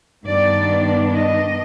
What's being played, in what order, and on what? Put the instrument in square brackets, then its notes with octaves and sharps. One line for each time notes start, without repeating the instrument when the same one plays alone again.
[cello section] G2 D#3 B3 D4 D5
D#5